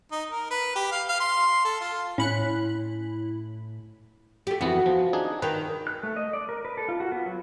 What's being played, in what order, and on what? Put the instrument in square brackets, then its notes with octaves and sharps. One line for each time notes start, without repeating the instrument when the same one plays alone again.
[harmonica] D#4
A#4
B4
G4
F5
F5
C6
A4
F4
[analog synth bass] A2 [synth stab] C#4 B5 F#6 [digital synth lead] E4
[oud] A3 G4
[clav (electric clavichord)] F2 E3 B3 [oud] F#4
[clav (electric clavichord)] F3
D4 D#4 G#4
[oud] D#3 [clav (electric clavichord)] B4 G5
[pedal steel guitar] F#6
A3
D#5
D5
A#4
B4
A4
F4
F#4
B3
F#3